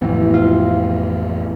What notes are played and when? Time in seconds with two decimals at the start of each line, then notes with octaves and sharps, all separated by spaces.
0.02 A1 F2 F3 B3
0.34 F4